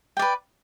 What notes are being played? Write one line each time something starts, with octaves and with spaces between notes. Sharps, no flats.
B4 D5 G5